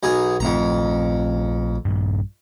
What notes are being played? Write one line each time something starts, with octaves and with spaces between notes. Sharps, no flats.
B1 G#4 A#5
A#1 F2 A3 C4 A#5
A#1 G2